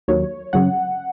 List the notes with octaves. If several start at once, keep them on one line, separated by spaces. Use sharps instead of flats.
D#2 D#3 F#3 C#5
F#2 C#3 F#3 F#5